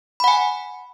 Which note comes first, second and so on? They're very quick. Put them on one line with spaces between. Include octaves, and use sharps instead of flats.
B5 F#5 G#5